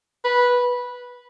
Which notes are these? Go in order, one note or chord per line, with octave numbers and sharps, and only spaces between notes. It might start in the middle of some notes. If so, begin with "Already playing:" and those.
B4